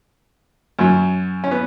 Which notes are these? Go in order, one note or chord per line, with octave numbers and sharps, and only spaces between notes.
F#2 F#3
C#4
B3